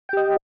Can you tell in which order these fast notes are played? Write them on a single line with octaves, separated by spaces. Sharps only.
G5 G4 D#5